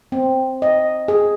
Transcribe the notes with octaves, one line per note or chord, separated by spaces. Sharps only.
C4
D#5
G#4